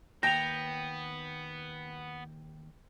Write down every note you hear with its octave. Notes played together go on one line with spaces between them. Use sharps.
D#2 B3 G5 A5 A#5 A#6 F7